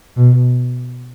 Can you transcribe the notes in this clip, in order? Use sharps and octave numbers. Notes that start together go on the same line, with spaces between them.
B2